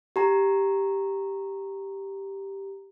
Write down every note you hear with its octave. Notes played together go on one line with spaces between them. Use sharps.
G4 A#5